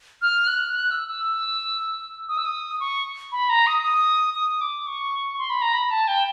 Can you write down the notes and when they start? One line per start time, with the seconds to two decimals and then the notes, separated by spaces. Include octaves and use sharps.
0.22 F6
0.47 F#6
0.73 F#6
0.91 E6
1.08 E6
2.29 D#6
2.38 E6
2.45 D#6
2.80 C#6
3.32 B5
3.49 A#5
3.67 D#6
3.83 D#6
4.35 D#6
4.61 D6
4.87 C#6
5.39 C6
5.50 B5
5.62 A#5
5.73 B5
5.91 A5
6.08 G5